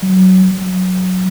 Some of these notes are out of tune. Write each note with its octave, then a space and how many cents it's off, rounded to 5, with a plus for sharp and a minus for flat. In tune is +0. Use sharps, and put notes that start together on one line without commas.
F#3 +15
F#3 -5